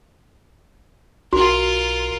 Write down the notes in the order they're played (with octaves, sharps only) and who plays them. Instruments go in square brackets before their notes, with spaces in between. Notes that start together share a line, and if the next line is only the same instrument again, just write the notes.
[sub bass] B1 [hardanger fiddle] F4 A#4 [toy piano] F#4